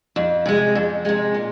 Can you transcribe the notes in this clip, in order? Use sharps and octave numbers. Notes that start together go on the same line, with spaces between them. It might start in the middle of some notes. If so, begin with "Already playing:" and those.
F2
C3 G#3
F2
C3 G#3
A#2